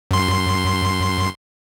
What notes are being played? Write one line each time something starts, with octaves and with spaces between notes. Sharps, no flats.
F#2 C6